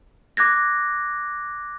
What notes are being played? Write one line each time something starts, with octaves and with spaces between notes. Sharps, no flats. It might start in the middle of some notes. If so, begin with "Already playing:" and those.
D6 F#6 G#6 A#6